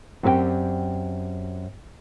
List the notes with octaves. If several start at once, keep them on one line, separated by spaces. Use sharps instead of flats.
F#2 C4 G4 G#4 D5 G5